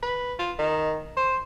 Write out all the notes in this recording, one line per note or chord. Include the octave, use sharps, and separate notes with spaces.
B4
F4
D#3
C5